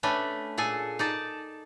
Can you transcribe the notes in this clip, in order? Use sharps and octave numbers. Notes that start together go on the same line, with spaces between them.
A3 C#4 D4 B4
A#2 G#4 A4 G#5
D#4 D5 A5